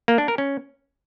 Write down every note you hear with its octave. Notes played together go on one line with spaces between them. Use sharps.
A#3
D4
A#4
C#4